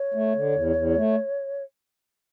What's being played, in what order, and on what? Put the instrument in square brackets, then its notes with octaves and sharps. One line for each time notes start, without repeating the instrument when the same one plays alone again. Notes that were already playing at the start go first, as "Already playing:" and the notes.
Already playing: [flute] C#5
[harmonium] A3
D3
E2
E2
A3